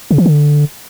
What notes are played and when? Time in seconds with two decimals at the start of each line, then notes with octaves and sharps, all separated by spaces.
0.11 C#3
0.18 E3
0.26 D3